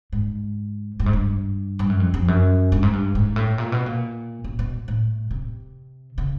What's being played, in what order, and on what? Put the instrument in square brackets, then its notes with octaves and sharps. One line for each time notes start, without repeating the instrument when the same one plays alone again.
[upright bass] G#2
G2
G#2
G2
G2
F#2
F2
F2
F#2
G2
G#2
G2
G#2
A2
A#2
B2
A#2
B2
B2
A2
C3
C#3